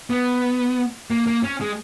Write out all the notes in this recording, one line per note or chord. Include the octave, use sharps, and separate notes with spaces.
B3
A#3
A#3
C#4
G#3